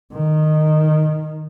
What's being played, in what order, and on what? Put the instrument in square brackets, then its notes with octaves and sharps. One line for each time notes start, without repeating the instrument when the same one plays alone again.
[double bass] D#3